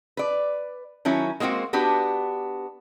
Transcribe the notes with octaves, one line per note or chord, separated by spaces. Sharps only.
B4 D5
D#3 F#3 C#4 E4
G#3 A#3 C4 F4 F#4
B3 D4 F#4 G4 B4